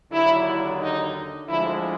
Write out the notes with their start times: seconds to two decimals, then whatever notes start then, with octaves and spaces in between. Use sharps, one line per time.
0.11 D#2 D3 F#3 E4
0.80 D#4
1.48 D2 D3 F3 G#3 E4